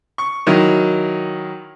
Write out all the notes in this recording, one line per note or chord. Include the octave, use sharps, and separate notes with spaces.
C#6
D#3 F#3 E4